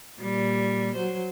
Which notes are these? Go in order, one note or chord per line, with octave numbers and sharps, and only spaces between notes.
A#2 G3
F#3 C5